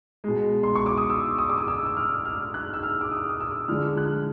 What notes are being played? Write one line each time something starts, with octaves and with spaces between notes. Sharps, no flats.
B2 G#3
C6
C#6
D6
D#6
E6
D#6
D6
D#6
E6
E6
F6
F6
F#6
E6
F6
D6
D#6
D#6
E6
D3 F3 G#3 F6
F#6